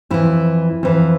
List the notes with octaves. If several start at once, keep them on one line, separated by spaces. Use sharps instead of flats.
F2 E3 E4
F2 E3